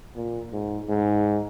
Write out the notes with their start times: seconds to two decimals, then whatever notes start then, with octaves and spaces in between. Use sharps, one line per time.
0.16 A#2
0.52 G#2
0.89 G#2